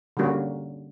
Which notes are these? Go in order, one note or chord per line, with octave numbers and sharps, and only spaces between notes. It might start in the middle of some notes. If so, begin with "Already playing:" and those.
D3 G3 A#3 C#4 F#4